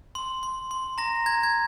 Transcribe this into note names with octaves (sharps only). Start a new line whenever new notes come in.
C6
C6
C6
A#5 A#6
A#5 G#6
G#6